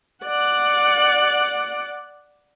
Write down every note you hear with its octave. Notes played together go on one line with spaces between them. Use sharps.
D5 F#5